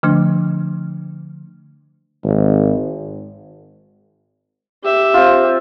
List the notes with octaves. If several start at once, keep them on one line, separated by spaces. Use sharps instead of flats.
D3 F3 A3 D4
G#1
G4 E5
C4 F4